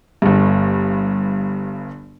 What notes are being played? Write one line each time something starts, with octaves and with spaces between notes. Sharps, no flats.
G1 G2